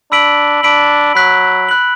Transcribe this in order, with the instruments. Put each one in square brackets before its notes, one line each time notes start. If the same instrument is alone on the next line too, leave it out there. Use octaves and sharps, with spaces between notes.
[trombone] D4 [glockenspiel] B5 E6 B6 D7 F#7
[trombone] D4 [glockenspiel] B5 E6 B6 D7 F#7
[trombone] F#3 [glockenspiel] B5 F#6 B6 F#7
[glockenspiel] B5 F#6 B6 F#7